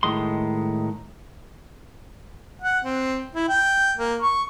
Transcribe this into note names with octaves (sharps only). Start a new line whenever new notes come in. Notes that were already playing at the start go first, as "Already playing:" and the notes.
A2 D#3 G#3 C6
F#5
C4
E4
G5
A#3
C#6